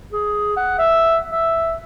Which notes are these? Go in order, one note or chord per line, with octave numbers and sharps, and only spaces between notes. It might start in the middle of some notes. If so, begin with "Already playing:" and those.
G#4
F#5
E5
E5